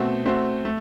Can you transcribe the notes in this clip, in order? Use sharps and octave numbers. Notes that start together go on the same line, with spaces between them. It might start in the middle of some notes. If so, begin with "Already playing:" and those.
Already playing: B2 A3 C4 F#4
A3 C4 F#4 C5
A3